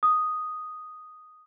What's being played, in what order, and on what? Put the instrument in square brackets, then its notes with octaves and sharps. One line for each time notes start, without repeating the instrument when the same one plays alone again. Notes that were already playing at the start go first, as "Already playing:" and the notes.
[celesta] D#6